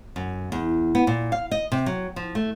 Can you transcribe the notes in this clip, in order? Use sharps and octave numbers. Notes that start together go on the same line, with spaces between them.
F#2
E2
B3
A#2
F5
D#5
C3
F#3
F3
A3